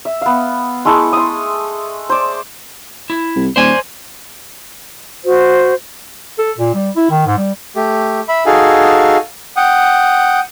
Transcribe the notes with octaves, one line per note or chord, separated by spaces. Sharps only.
E5
B3 F5
G#3 A3 E4 A4
C6 D#6
C5 D5
E4
C2
D#1 C5 D5 G#5
F#4 C5
A4
A#2
G3
E4
D#3
G#2
G3
A3 G4
E5 B5
D#4 F#4 G#4 A4 F5 G#5
F#5 G5 D#6